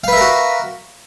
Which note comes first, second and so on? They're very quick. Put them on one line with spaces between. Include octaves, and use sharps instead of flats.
F5 B4 E5 A#4 F#4